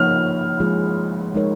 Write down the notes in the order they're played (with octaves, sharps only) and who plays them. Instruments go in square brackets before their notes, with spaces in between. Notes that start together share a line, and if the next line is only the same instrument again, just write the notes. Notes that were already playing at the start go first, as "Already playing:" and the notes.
Already playing: [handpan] F3 A#3 D#4 C#5 [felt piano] F6
[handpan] F3 G#3 F4 G#4
G#3 D#4 A#4 C#5